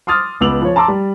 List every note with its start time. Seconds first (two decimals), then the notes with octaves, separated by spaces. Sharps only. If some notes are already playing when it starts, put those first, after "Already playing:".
0.07 C6 D6 D#6 F6 A6
0.40 C#2 B3 D6 E6 F7 F#7
0.62 F3 C#5
0.76 A5 A#5 C6 D6 E6
0.88 G3